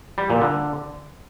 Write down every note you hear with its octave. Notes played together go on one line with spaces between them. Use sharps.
G3
A#2
D3